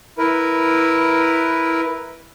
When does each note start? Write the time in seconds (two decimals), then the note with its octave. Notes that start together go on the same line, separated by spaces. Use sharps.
0.18 E4 A#4 B4